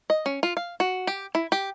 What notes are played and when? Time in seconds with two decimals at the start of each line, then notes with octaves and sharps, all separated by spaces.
0.10 D#5
0.26 C#4
0.43 F4
0.57 F5
0.80 F#4
1.07 G4
1.35 E4
1.52 G4